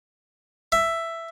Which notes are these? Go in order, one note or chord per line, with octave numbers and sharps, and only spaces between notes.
E5